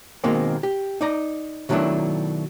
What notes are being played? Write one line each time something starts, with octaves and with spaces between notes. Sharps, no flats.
B2 D#3 G#3 A#3 C4
G4
D#4 D5 A#5
B2 D#3 F#3 A3 D4 E4